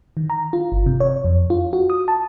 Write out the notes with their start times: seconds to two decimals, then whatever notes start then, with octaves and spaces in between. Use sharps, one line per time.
0.17 D#3
0.30 A#5
0.53 F4
0.72 G1
0.86 C3
1.00 C#5
1.25 F2
1.50 F4
1.73 F#4
1.90 D#6
2.08 A5